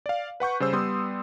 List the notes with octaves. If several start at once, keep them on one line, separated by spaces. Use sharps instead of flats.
D5 F5
B4 F#5 C#6 G6
C#3 G3 C5 E6
G3 B3 C6 D#6